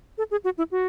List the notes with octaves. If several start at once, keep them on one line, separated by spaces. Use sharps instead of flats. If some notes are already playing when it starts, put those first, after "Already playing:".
A4
G#4
F#4
E4
F#4